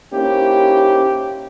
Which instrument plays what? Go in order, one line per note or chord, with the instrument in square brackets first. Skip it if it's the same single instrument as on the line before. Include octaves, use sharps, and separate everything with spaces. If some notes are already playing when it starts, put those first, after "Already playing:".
[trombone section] A#3 C#4 D#4 E4 G4 C5